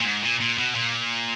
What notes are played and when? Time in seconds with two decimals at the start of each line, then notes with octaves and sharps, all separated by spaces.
0.01 A#2
0.05 G#2
0.23 A#2
0.40 A#2
0.58 B2
0.75 A#2